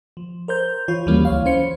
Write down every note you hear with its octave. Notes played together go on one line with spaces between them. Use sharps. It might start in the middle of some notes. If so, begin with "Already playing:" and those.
F3
A#4 C5 G6
E3 F4 C#5
D#2 E3 F#3 G3 A#3 C#4
C#2 C#5 F5
E3 C#4 C5 C#7